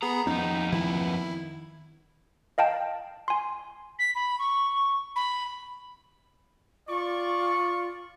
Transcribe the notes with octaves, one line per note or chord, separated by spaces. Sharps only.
B3 G#4 A#5 B5
F2 B3 C#4 D#4
D#3 E4
D#5 F5 G5 A5
G#5 C6
B6
B5
C#6
B5
F4 D5 C#6